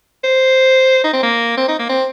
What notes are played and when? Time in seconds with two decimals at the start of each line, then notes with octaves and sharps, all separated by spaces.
0.24 C5
1.04 D#4
1.13 C4
1.23 A#3
1.57 C4
1.68 D#4
1.79 A#3
1.89 C4